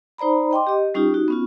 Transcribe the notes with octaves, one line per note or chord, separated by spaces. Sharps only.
D#4 C5 D5 A#5 B5
D#5 G5 C6 D6
G4 D#5
G3 C#4 D#4 F4 G4
D#4 F#4
B3 C#4 F4